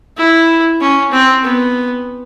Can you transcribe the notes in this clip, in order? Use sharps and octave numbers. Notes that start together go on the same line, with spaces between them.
E4
C#4
C4
B3